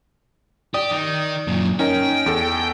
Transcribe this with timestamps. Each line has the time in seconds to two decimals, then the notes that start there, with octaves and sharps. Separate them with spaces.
0.74 G4 D5 D#6
0.91 D#3
1.47 F#2 A#2
1.79 C#4 D#4 A#4 G5
2.26 E2 A4